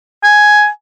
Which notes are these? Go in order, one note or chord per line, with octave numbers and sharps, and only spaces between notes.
G#5